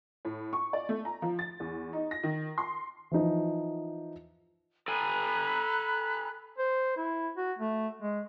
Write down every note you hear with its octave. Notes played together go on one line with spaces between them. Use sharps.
A2
C#6
D5
A3
A#5
F3
A6
E2
D#4
A#6
D#3
C6
E3 F3 D#4
A4 G5 G#5 A#5 B5 F#6
C5
E4
F#4
A3
G#3